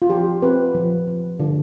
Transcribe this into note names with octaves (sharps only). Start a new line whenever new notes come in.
F4
F3 G4
C4 B4
F3
F3
D3